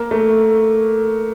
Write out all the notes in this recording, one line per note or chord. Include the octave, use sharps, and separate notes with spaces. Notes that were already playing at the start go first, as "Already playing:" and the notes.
Already playing: A#3
A3